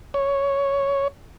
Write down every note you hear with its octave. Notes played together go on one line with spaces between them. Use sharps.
C#5